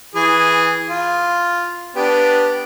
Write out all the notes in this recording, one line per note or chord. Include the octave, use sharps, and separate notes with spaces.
E3 G#4
F4
B3 D4 G4